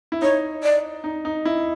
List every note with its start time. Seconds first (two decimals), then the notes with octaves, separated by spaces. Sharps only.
0.12 E4
0.22 D#4 C#5
0.63 D5
1.04 D#4
1.25 D#4
1.45 E4